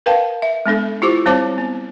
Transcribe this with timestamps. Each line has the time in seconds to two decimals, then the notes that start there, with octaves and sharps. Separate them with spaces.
0.06 A#4 B4 F5 G5 A5
0.42 E5
0.66 G#3 B3 D4 A4
1.02 E4 F4 G4 C5 D6
1.26 G3 C4 C5 C#5 A5 D6
1.58 B3